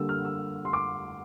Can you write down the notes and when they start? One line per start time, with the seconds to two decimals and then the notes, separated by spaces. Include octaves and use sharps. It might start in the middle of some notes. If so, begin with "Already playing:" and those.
Already playing: D3 G3 A#3 E6
0.09 F6
0.25 E6
0.65 C6
0.73 D6